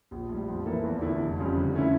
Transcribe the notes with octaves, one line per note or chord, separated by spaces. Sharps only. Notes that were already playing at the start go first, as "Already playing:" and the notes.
A#1
A2 G3
F2
E3 A#3 E4 A4
E2
D3 A3 E4
F1
F2 C#3 G3
D3
A3 C#4 E4